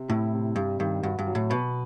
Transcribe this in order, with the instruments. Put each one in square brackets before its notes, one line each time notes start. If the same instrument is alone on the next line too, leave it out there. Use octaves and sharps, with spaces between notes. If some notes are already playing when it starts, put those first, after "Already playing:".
Already playing: [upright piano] C3
[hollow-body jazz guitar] A2 [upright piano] E4
[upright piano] C3
[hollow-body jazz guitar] G2 [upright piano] G3
[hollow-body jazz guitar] G2 [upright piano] D#3
[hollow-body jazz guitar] G2 [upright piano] F#4
[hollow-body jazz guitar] G2
[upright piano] F#3
[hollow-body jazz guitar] A2
[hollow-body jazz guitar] B2 [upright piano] B4